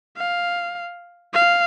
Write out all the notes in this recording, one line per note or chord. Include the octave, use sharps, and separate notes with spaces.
F5
F5